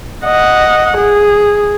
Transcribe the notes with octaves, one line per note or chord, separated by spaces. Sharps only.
D#5 F#5
G#4